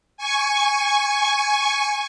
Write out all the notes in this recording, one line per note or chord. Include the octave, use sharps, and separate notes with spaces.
G#5 C#6